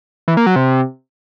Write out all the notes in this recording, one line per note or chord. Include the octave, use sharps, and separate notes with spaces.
E3
A#3
F#3
C3